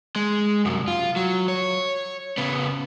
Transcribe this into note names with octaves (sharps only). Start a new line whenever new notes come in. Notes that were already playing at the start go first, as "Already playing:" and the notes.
G#3
C2 F#2
F4
F#3
C#5
C#3 B3